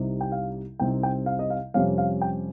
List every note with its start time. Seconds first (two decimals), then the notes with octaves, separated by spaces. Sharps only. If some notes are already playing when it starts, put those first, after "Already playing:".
Already playing: C2 C3 G3 C4 D#4
0.21 G5
0.32 F5
0.80 C2 C3 G3 C4 D#4 G5
1.03 G5
1.26 F5
1.39 D#5
1.50 F5
1.74 F2 C3 G3 C#4 F5
1.98 F5
2.21 G5